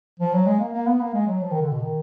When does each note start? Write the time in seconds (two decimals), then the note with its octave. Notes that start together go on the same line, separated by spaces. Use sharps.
0.19 F3
0.33 F#3
0.46 G#3
0.60 A#3
0.73 A#3
0.87 B3
1.01 A#3
1.14 G#3
1.27 F#3
1.41 F3
1.51 D#3
1.62 D3
1.71 B2
1.82 D#3